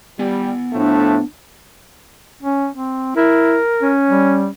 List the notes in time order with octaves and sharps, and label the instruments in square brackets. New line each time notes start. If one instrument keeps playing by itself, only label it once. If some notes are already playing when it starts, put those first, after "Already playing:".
[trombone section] G3 [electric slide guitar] B3 G#5
[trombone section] A2 F3 A3 [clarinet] D4
[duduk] C#4
C4
[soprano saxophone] E4 [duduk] A#4
[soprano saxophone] C#4
[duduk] G3